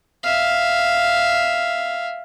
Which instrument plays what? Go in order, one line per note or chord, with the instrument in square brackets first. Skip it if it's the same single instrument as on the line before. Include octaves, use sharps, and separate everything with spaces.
[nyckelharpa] E5 F5